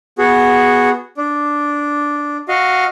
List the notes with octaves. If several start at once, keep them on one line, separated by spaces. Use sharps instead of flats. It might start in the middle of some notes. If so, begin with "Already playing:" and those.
B3 F#4 G#4
D4
F#4 D#5 F5